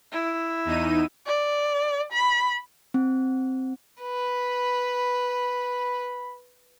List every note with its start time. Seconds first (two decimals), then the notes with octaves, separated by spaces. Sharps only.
0.12 E4
0.65 E2 D#4 D#7
1.26 D5
2.12 B5
2.94 C4
4.02 B4 B5